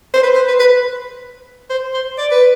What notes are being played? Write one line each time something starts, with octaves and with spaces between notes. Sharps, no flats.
C5
B4
C5
B4
B4
C5
C5
D5
B4